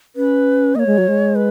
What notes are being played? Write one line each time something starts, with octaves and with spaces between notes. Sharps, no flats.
C#4 B4
A#3 C#5 D#5
G#3
F#3
G#3
B4